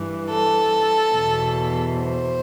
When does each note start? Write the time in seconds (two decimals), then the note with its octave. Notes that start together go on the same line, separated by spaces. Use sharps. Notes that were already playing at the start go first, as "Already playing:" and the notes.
Already playing: G2 E3
0.31 A4
1.14 E2 B2
1.97 C5